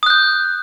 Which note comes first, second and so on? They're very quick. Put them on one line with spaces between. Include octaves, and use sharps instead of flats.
D#6 F#6 G6